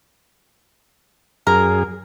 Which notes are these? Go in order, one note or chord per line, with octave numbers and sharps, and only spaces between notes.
F#2 G#4 A#4